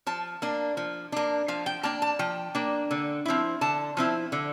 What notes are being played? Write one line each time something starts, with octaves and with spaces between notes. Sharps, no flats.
F3 A5
A#3 D4
F3
A#3 D4
F3 F5
G5
A#3 D4 A5
A5
F3 G5
A#3 D4
D3
F3 C4 E4
D3 A5
F3 C4 E4
D3